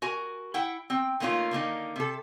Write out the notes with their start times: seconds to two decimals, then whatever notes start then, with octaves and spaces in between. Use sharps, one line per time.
0.02 F#4 A#4 G#5
0.54 E4 F#5 G5
0.90 C4 G5
1.20 D#3 A3 A#3 C#4 F4
1.51 D3 D#3 A#3 D#4
1.96 C3 A4